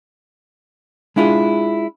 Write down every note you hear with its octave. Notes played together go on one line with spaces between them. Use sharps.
G#3 D4 E4 F4 G4 G#4